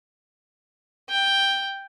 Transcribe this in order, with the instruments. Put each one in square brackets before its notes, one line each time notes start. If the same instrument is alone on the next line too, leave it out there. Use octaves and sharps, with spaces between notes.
[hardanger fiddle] G5